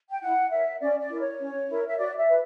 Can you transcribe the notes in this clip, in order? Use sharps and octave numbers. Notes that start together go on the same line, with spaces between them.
G5
E4 F#5
A#4 C#5 E5
C#4 D5
D5
E4 A#4
C#5
C#4
E4 A#4
E5
F#4 D5
E5
B4